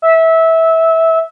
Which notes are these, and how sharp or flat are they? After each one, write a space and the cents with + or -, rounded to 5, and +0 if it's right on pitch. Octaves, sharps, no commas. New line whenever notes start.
E5 -20